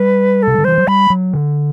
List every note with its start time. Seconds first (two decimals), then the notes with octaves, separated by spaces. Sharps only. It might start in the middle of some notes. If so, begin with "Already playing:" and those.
Already playing: G3 B4
0.43 C3 A4
0.58 D3
0.65 E3 C5
0.78 F#3
0.87 G3 B5
1.10 F#3
1.33 D3